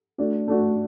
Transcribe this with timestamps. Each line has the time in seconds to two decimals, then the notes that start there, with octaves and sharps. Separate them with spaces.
0.18 A3 D4 F#4
0.48 A3 D4 F#4